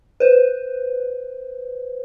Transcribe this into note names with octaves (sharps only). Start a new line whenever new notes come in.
B4 C5